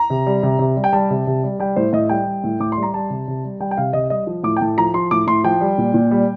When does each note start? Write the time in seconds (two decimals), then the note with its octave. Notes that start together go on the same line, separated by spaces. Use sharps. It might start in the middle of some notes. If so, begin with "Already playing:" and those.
Already playing: A#5
0.10 C3
0.26 G3
0.43 C3
0.59 C3
0.76 G3
0.84 G5
0.93 G3 A5
1.10 C3
1.27 C3
1.44 G3
1.59 G3 G5
1.76 A2 C5
1.93 A2 D#5
2.09 G3 G5
2.26 G3
2.44 A2
2.60 A2 D6
2.72 C6
2.77 G3
2.83 A#5
2.94 G3 A5
3.10 C3
3.28 C3
3.44 G3
3.60 G3 G5
3.71 G5
3.77 C3 F5
3.93 C3 D#5
4.10 G3 D#5
4.27 F3
4.43 A2 D6
4.57 G5
4.61 A2 A5
4.78 F3 A#5
4.94 F3 C6
5.11 A2 D6
5.27 A2 C6
5.44 F3 G5
5.61 G3
5.78 A#2
5.94 A#2
6.11 G3